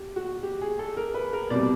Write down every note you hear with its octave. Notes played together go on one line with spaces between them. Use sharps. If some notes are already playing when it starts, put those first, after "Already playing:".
Already playing: G4
F#4
G4
G#4
A4
A#4
B4
A#4
C2 B2 G3 D5